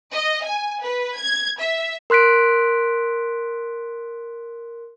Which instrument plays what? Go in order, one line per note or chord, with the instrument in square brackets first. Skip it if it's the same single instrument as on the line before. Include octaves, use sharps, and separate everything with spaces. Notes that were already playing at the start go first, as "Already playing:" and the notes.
[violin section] D#5
G#5
B4
G#6
E5
[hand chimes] A#4 C6 F#6 B6 D7